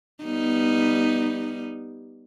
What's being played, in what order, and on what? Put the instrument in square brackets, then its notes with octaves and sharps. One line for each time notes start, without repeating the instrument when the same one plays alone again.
[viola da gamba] G3 B3 D#4